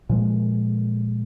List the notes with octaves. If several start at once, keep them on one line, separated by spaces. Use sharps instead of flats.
A#2 F3 G#3